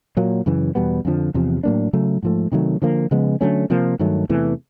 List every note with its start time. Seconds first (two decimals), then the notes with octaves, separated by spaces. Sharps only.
0.17 A#2 F#3 A#3
0.46 F#2 C#3 E3
0.75 E2 B2 G3 B3
1.05 F2 D3 F3
1.34 E2 C3 F3
1.63 A2 F#3 A#3 D4
1.93 C#3 F#3 A3
2.23 G#2 F3 A3
2.52 C3 D#3 F#3 A3
2.82 D3 F3 A#3
3.11 C#3 F3 G#3 B3
3.41 D3 F#3 A3 C#4
3.70 C3 F3 A#3
3.99 G2 D#3 F#3 A3
4.29 E2 C3 E3 A3